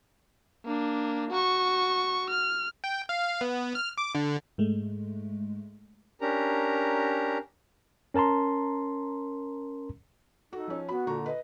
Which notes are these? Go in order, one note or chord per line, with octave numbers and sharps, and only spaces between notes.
A#3 D4
F#4 C#6
F6
G5
F5
B3
F6
D6
D3
G#2 G#3 A3
C#4 D4 G4 A#4 A#5
C#4 A#4 A5 A#5 C6
D#4 F#4 A4
F3 C#4
B3 F#4 B5
A#2 D3 A#5 C#6
B4 D#5